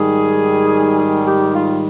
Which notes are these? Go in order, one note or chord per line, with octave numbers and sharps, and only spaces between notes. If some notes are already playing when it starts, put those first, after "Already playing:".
Already playing: G#2 D#3 G3 G#4
G#4
G4
F4